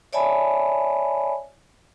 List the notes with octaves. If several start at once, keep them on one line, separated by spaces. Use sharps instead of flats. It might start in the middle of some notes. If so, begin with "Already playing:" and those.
C#5 D5 E5 G#5 A5 B5